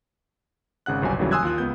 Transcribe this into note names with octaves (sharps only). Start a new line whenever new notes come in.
G#1 C#3 F#5 F#6
G1 C2 F#3 G#5
G#1 D#2 C#3 E3 F#3 G3
G#5 C6 D#6 E6 F#6 G#6
D#2 F4 F#6
C#2 B3 G6